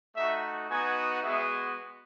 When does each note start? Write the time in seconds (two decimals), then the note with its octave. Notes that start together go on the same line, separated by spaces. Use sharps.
0.16 A3 D#4 F#4 E5
0.69 B3 D#4 F#4 G#5
1.22 G#3 B3 F#4 E5